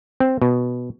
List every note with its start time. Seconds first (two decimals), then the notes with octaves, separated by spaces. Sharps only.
0.20 C4
0.42 B2